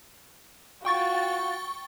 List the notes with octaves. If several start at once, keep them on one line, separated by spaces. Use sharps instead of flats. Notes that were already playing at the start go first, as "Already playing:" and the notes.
F4 F#4 G5 C#6 A6